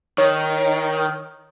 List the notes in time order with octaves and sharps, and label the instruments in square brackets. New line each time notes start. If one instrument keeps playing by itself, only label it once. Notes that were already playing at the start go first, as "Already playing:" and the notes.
[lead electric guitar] D#3 [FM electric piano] C#5